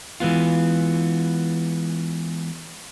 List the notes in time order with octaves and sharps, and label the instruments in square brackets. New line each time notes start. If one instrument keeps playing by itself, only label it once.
[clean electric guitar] E3 G#3 B3 F4